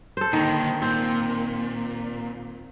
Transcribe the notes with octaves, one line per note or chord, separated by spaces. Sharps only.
A4 C5
A#2 D3 D#3
A#2 C4